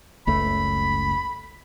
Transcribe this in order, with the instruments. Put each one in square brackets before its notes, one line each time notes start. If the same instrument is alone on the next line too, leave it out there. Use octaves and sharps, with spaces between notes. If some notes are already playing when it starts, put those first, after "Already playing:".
[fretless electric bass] F#1 C#2 A3 [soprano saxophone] B5